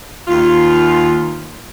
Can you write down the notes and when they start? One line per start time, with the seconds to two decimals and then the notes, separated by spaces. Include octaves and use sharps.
0.27 D#2 F4